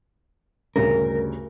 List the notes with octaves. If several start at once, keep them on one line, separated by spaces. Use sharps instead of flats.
D2 G2 C#3 A#4